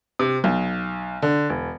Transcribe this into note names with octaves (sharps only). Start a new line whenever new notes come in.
C3
B1
D3
E1